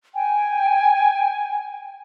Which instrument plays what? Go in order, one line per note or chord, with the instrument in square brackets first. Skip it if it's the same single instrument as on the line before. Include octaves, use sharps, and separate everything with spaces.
[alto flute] G5 [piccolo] G#5